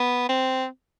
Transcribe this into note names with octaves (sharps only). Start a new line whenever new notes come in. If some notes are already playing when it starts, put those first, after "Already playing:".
Already playing: B3
C4